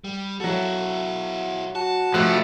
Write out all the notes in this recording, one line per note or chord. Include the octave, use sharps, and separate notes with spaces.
G3
F#3 E4 F#4 A4
F#4 A5
F3 A3 G4 F#6